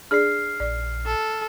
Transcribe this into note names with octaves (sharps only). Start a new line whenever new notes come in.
D4 G#4 D5 F6 C7
A#1 D5
A4